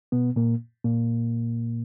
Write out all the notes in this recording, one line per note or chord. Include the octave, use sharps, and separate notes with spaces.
B2 B3
A#2 A#3
A#2 A#3